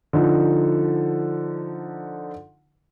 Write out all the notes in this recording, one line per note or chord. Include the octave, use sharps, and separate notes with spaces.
D3 F3 D#4